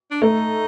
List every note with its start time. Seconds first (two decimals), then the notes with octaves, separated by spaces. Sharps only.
0.11 D4
0.22 A3 D#4